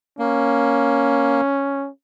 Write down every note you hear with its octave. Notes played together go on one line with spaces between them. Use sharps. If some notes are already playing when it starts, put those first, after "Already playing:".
A#3 C#4